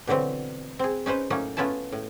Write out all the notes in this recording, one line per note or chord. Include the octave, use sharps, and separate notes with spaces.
B2 D3 E3 F#3 C4
C4 G#4
C#4 D#4 B4 C5
A2 F#3 A#3 C#4 D#4
A3 B3 C#4 E4 F4 A5
A2